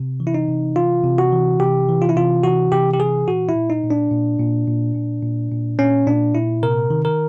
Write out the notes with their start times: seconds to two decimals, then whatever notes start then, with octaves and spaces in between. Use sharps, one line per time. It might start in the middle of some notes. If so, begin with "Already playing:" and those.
Already playing: C3
0.20 E3
0.27 E4
0.34 D#4
0.48 C3
0.76 E3 F4
1.04 C3
1.18 F#4
1.32 E3
1.60 C3 G4
1.88 E3
2.02 F4
2.09 E4
2.16 C3 F4
2.44 E3 F#4
2.72 C3 G4
2.94 G4
2.99 E3 G#4
3.28 A#2 F#4
3.49 E4
3.56 A#2
3.70 D#4
3.83 A#2
3.90 D4
4.11 A#2
4.39 A#2
4.68 A#2
4.95 A#2
5.23 A#2
5.52 A#2
5.79 A#2 C#4
6.07 A#2 D4
6.35 A#2 E4
6.63 C3 A#4
6.90 D#3
7.05 A#4